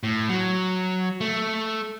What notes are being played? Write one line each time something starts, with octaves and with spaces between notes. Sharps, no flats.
A2
F#3
A3